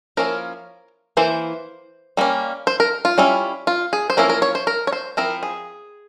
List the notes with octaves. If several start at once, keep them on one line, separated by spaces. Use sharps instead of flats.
F3 A#3 C#4 E4 A#4
E3 A#3 E4 C5
G3 A#3 C#4
C5
A#4
F4
G3 C#4 E4
F4
G#4
C5
F3 A#3 C#4 E4 A#4
A#4
C#5
C5
A#4
C#5
C5
F3 C4 E4 A#4
G#4